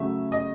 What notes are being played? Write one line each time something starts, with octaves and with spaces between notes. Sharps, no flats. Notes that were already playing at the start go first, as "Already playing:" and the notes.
Already playing: C#3 F#3 A3 E5
D#5